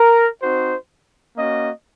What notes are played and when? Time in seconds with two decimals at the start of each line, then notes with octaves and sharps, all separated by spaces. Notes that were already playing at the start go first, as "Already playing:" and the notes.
Already playing: A#4
0.42 C4 D#4 F#4 C5
1.37 A#3 C#4 F#4 D#5